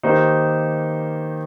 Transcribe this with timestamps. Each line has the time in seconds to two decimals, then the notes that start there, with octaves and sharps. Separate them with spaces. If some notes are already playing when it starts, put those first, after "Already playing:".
0.03 D#3 A#3 D#4 G4 C5